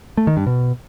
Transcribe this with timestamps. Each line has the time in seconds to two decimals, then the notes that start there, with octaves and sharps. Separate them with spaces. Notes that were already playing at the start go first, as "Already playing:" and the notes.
0.17 A3
0.27 D#3
0.37 G2
0.46 B2